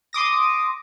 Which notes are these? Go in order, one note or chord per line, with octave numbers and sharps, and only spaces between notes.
C6 D6 D#6 A#6